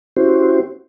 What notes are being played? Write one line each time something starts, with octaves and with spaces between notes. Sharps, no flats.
C#4 E4 F#4 G4 C5